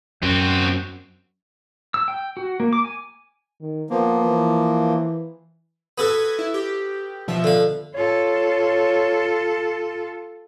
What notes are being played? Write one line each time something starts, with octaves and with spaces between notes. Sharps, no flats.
F#2 C4 F#4
E6
G5
F#4
A#3
D6
G#5
D#3
F3 A#3 B3
E3
B3 F#4 A4 G#6 B6 D#7
E4
G4
B2 F3 E5
D3 F5
F4 A4 C#5